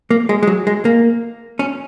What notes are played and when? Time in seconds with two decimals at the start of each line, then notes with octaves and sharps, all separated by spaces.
0.11 A#3
0.29 G#3
0.43 G#3
0.47 F#3
0.67 G#3
0.85 A#3
1.59 C#4